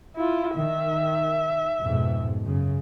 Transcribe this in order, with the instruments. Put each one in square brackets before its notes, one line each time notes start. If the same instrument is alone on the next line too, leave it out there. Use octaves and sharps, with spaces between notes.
[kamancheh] E4 F4
[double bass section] D#3 [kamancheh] E5
[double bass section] F2 G#2 B2
F#2 C#3